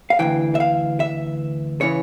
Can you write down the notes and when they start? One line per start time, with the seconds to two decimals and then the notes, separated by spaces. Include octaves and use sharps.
0.10 F5
0.19 D2 C#3 E3 G5
0.55 E5
0.60 F5
1.00 E5
1.81 C#3 E3 C#5